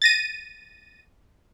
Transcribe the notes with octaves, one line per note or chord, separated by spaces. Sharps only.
A6 A#6 D#7